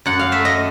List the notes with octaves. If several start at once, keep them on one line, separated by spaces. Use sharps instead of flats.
F#2 F#5
F5
A3 E5
D#5